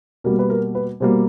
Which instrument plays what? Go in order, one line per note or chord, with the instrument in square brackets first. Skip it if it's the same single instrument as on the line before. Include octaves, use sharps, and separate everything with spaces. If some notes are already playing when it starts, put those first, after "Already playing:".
[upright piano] B2 G3 A#3 A#4
B4
A#4
B4
B2 G3 A#3 C5